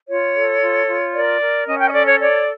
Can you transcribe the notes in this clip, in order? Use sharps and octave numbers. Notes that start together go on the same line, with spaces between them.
F4 C#5
A4
F4
F4
A#4 D5
A#4
C#4 D#5
G5
D#5
A4 D5
C#5
C#5 D5